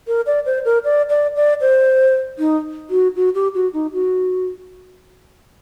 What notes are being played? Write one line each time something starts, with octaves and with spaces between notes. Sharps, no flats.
A#4
D5
C5
A#4
D5
D5
D5
C5
D#4
F#4
F#4
G4
F#4
D#4
F#4